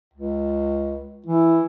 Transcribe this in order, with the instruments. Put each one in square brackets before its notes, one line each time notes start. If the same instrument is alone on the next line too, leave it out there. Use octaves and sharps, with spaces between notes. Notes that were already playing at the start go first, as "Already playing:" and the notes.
[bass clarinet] C#2
[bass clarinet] E3 [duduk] E4